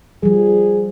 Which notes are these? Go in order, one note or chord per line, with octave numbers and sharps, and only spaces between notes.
F3 G3 G#4